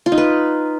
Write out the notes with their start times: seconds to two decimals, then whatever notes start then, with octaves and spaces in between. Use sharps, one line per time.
0.06 F4
0.12 D#4
0.18 B4